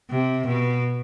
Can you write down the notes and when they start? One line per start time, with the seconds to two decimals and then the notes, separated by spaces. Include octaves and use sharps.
0.11 C3
0.46 B2